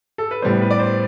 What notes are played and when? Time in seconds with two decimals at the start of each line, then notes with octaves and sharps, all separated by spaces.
0.18 A4
0.31 B4
0.42 A2 G3 B3 C5
0.61 B4
0.71 D5
0.79 C5